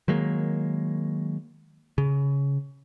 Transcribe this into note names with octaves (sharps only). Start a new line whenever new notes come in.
D#3 F#3 G#3 A#3
C#3